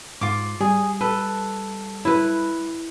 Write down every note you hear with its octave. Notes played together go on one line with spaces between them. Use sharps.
G#2 F4 D6
G3 G#4
A4 B4
E4 B4